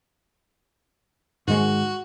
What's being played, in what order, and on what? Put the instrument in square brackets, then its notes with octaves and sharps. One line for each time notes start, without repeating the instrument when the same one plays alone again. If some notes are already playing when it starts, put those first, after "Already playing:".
[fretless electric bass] G#2 D#3 G#3 [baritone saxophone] F#4